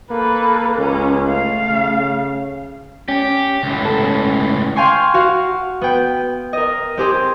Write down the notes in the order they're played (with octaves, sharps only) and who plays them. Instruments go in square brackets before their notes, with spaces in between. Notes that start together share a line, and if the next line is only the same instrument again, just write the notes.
[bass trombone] A#3 [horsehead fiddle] A4 B4
[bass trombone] C#2 [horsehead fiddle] C#4
[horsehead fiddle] A3 F5
[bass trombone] C#3
[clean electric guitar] C#4 [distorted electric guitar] G4
[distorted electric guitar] C#2 A2
[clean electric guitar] A4
C#4
[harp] F5 G5 G#5 C6 C#6
F#4 F5
B3 G5
A#4 D#5
C4 G4 G#4